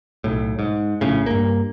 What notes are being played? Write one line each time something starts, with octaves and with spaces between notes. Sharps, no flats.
B1 A2
G#2
A#1 A2 C#3
G2 A#3